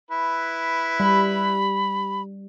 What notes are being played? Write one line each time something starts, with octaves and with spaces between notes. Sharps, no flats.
E4 B4
G3 B5